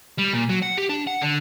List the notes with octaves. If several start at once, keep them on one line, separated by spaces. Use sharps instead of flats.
G3
A#2
F#3
F#5
G4
D4
F#5
D3